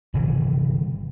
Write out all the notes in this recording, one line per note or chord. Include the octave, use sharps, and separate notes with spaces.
G1 C3 D#3 E3